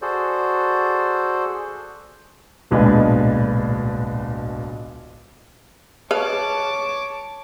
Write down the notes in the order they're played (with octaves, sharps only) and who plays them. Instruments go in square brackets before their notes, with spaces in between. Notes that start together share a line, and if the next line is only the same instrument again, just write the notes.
[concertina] F#4 G#4 A4 C5 D5
[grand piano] D1 B1 A#2 G#3 D4 B4
[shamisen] G#4 B4 F5 [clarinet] C#5 [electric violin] A5 D6